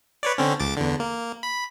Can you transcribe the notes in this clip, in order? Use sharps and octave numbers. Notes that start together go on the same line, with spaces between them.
B4 C#5 D5
D3 C4 C#4
C#2 D6 A6
E2 D3
A#3
B5